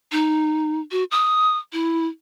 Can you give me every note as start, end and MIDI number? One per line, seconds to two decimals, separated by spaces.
0.12 0.80 63
0.92 1.04 66
1.11 1.58 87
1.73 2.07 64